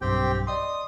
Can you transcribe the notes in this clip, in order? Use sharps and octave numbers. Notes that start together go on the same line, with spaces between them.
B1 G2 C4 G4 G5
D5 D#5 C6 D#6